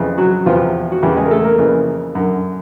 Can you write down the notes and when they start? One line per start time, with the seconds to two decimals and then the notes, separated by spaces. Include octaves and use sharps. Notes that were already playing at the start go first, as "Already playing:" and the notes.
Already playing: F2 C#3 E3
0.18 F#3 F#4
0.46 E2 C3 E3 F3 F4
0.92 F#4
1.02 E2 C#3 E3 G3 G4
1.17 G#3 G#4
1.25 A#4
1.31 A3 A4
1.44 A#3 A#4
1.59 F2 C#3 E3
2.15 F#2 D3